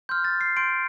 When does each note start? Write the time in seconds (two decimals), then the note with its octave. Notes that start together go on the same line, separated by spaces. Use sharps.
0.09 C6 F6 G6
0.24 A6
0.41 C7
0.57 C6 G6 D7